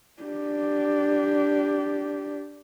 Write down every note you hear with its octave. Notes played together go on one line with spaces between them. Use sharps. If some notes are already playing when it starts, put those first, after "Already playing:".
D4 G4